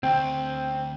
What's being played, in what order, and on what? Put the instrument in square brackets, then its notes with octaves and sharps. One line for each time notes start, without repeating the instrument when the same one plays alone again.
[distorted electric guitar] D2 [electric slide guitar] C4 [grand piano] G5